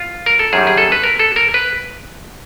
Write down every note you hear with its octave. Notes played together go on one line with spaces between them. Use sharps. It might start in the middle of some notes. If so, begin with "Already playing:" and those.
Already playing: F4
A#4
A4
F#2 D#3 G3 G#4
G#4
A4
B4
A#4
A4
A#4
B4